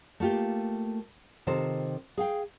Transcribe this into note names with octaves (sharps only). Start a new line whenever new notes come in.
A3 A#3 F4 G4
C3 D#3 F4 A4 C5
G#4 F5 G5